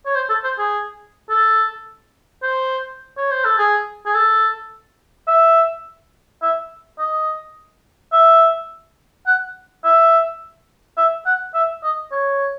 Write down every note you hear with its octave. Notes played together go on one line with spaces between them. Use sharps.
C#5
C5
A4
C5
G#4
A4
C5
C#5
C5
A4
G#4
G#4
A4
E5
E5
D#5
E5
F#5
E5
E5
F#5
E5
D#5
C#5